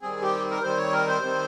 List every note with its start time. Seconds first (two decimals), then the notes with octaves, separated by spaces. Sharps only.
0.02 D#3 G3 C4 G#4
0.22 G4
0.51 A#4
0.62 D#3 G3 C4 C5
0.78 C#5
0.92 A#4
1.08 C5
1.22 D#3 G3 C4